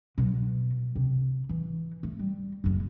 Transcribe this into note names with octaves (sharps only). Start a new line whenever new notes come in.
B2 F#3
C3
E3
A3
G3
F#1 F#2